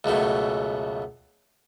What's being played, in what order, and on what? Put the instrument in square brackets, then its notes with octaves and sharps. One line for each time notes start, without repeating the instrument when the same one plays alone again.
[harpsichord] C#2 F#2 B2 A3